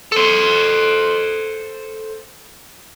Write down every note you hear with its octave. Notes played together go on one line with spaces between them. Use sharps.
A4 C5